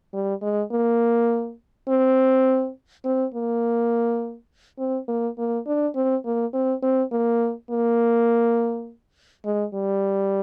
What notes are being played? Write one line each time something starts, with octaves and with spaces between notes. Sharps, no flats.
G3
G#3
A#3
C4
C4
A#3
C4
A#3
A#3
D4
C4
A#3
C4
C4
A#3
A#3
G#3
G3